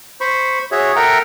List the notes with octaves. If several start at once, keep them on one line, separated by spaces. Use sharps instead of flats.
C5 B5 C#6
F#4 G#4 C#5 E5
A4 A#4 E5 F#5 G5 A#5